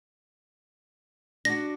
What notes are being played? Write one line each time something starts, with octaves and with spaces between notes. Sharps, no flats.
D4 F#4 A#6